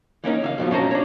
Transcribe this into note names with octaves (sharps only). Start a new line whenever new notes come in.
E3 A#3 C#4 D#4
C#2 E5 F5
F2 B2 F3
F#2 C#4 C5 A5 A#5
D4 C#5